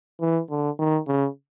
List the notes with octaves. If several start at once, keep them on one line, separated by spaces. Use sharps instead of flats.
E3
D3
D#3
C#3